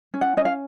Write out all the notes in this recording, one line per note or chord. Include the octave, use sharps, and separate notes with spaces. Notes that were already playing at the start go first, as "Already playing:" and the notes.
C#4
F#5
C#4 D#5
F5